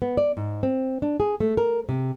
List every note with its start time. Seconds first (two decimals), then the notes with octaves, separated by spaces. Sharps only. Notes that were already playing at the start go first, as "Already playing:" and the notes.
0.02 B3
0.17 D5
0.37 G#2
0.63 C4
1.02 D4
1.20 G#4
1.40 A3
1.57 A#4
1.89 C3